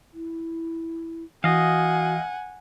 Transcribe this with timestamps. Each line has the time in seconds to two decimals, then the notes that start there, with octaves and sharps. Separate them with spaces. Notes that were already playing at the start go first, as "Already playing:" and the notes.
0.14 E4
1.44 E3 F#4 D#5 F5 F#5 G#5